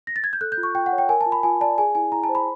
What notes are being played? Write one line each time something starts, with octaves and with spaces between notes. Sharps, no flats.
A#6
A6
G#6
G6
A4 F#6
G6
F4
C#6
F4 G5
F#5
C#5
G5
A#4 G#5
A5
F4
B5
F4 G#5
D5 A5
G#4 G#5
E4 G#5
E4 A#5
A5
C5
B5